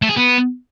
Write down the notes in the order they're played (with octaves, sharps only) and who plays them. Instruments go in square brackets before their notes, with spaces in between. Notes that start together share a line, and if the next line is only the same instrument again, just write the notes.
[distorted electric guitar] A3
G#4
B3